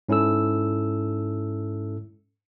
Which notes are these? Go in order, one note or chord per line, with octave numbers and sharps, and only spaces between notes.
G#2 C#4 E4 A4 E6